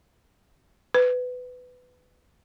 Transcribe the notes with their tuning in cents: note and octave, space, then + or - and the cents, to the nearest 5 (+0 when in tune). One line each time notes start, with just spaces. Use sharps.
B4 +20